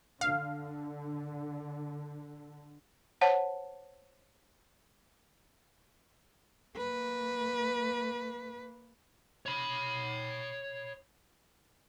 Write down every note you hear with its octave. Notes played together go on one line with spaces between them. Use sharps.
D3 F5
C5 C#5 F#5 A5
A#3 B4
C#5 B5